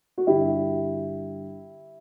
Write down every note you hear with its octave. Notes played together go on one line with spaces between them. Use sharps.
F#4
G2 D3 E4 G4